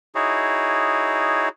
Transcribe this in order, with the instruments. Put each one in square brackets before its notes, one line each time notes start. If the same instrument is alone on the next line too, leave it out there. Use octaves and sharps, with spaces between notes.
[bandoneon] D#4 E4 F#4 G#4 C#5